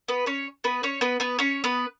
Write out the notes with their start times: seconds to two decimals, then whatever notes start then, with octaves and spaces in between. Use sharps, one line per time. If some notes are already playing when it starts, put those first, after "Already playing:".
0.08 B3 B4
0.26 C#4 C#5
0.64 B3 B4
0.83 C#4 C#5
1.01 B3 B4
1.20 B3 B4
1.39 C#4 C#5
1.64 B3 B4